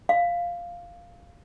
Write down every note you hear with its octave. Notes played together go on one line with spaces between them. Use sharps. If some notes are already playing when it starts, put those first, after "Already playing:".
F5